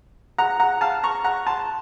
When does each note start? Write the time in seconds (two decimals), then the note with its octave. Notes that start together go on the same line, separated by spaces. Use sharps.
0.38 F#5 A#5
0.60 F#5 A#5
0.81 F5 A5
1.03 A#5 C#6
1.24 F#5 A#5
1.47 A5 C6